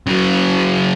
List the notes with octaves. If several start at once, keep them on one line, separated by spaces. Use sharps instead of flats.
C#3 F#3